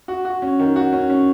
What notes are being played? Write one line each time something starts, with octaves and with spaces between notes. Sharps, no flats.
F#4
F#4
C#4
D#3
F#4
C#4
C#4